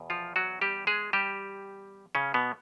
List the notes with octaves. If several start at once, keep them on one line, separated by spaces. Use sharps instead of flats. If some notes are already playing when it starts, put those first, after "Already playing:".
Already playing: E2 B2
F3 F4
F#3 F#4
G3 G4
G#3 G#4
G3 G4
C#3 C#4
B2 B3